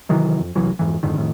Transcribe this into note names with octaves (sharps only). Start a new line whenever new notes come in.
C3 D#3 E3 F#3
F2
E1 C2 E3 F#3
F2 G#2 E3
F2 G#2 D3 D#3
F2 A2 D#3